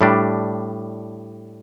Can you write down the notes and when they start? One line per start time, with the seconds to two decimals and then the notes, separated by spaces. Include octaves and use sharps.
0.01 A2 G3 D4